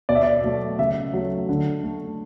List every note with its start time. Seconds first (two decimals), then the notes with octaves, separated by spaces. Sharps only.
0.09 B2 D5
0.15 E5
0.23 D5
0.44 F#3 A3
0.79 C#3 E5
1.13 F#3 A3
1.49 D3
1.83 A3